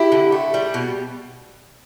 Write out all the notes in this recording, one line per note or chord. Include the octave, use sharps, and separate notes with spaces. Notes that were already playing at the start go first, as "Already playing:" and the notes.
Already playing: E4 G4
D3
A3
G3
B2